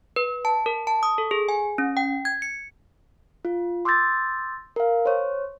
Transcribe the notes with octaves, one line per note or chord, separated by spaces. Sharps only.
B4
A5
A#4
A5
D#6
A4
G#4
G#5
C#4
G5
G#6
C#7
F4
C6 D6 E6 G6 A6 A#6
A#4 F5
C5 C#5